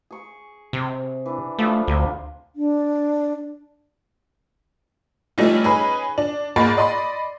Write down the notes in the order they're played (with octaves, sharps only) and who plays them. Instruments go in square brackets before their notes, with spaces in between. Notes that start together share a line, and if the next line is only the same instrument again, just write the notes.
[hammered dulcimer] G#4 C#6
[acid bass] C3
[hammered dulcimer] E3 D4
[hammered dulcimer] F3 G3 D4 [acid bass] A3
[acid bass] D2 [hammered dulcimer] C3 F3
[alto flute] D4
[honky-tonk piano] E3 G3 A3 C#4 D#4 F4
C#4 D#4 G#4 B4 B5
D4
G#2 G#3 A#3 B5 C#6 A6
D5 D#5 B5 C6